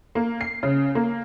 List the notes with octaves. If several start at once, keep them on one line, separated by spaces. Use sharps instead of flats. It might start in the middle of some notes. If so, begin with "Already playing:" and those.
A#3
C7
C#3
A#3